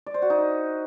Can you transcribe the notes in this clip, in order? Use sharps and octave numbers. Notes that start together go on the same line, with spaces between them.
D5
C5
F#4
D#4